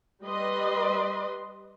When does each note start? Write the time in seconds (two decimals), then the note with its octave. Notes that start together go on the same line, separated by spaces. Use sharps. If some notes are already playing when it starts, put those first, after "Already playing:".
0.23 G3 B4 D#5 C6